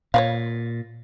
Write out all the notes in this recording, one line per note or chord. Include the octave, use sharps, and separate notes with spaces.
A#2 C#5 D5 F5